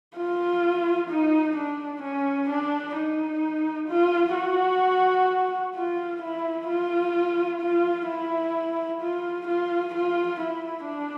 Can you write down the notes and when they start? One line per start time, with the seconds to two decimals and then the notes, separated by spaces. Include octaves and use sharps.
0.17 F4
1.10 D#4
1.56 D4
2.02 C#4
2.49 D4
2.96 D#4
3.89 F4
4.35 F#4
5.75 F4
6.22 E4
6.68 F4
7.61 F4
8.08 E4
9.01 F4
9.47 F4
9.95 F4
10.40 E4
10.87 D4